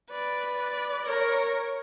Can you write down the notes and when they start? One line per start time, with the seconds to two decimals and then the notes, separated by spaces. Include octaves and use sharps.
0.11 B4 D5
0.59 D5
1.06 A#4 C#5